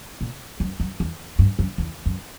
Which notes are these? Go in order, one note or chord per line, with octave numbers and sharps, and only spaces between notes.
A#2
F#2
F#2
E2
G2
F#2
E2
F#2